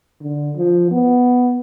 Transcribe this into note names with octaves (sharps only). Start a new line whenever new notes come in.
D3
F3
B3